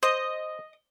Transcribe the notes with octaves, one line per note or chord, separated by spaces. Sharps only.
C5 D#5